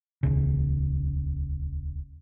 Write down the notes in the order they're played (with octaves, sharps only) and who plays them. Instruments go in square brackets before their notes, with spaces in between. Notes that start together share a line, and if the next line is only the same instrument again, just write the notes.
[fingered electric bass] D#1 C#2 C#3